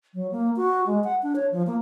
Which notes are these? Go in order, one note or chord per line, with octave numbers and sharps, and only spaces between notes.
F#3
A#3
F#4
G#3
F#5
D4
C#5
F3
A#3